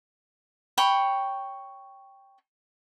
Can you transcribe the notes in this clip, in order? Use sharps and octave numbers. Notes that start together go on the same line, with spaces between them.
C#5 G5 B5